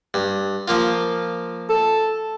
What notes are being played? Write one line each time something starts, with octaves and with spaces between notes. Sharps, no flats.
G2
F3 A#3 F4
A4